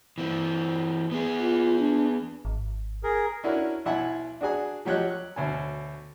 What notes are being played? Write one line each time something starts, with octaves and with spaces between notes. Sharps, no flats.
E3 C4
B3 G#4
F4
D4
G#1
G#4 A#4
C#4 D4 E4 F#4 A#4
B1 E4 E5 F#5 G#5
D4 F#4 G#4 G#5
F3 F#3 G4 C#5 D#5 F#6
F#6
D2 B2 C#5 G#5